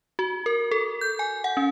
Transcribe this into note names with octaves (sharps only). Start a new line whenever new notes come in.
F#4
A#4
A4
G6
G#5
F#5
C#4